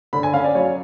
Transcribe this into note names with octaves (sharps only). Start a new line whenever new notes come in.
D3 B5
G#5
C#4 F5
D5
F#3 C#5